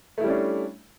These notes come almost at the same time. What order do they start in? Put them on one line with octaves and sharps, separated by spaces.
A3 E4 G3 C#4 D4